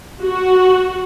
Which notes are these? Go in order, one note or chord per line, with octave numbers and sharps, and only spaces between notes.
F#4